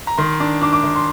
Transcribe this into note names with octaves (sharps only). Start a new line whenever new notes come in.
A#5
D#3 C6
D4
D4 D6
D6
D#3
C6